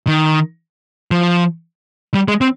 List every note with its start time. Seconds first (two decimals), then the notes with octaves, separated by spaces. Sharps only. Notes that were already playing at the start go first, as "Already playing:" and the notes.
0.07 D#3
1.11 F3
2.14 G3
2.28 G#3
2.41 C4